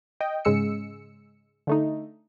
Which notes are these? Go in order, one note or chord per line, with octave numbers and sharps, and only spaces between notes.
D#5 G5
G#2 C#3 G#3 E6 C#7
D3 A3 D#4